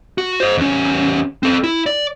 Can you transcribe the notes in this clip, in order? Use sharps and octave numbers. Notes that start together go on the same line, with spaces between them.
F#4
C5 D#5
E2 C#4
C4 A4
E4
D5